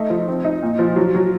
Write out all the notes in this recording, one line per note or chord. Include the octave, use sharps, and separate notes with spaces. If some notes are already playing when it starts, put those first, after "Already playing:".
Already playing: A3 D#4
F3
C4
D#4
A#2
F3
F#3
F#3